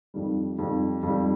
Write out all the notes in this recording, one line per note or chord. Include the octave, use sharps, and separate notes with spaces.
F2 D#3 G3
F2 D#3 G3
F2 D#3 G3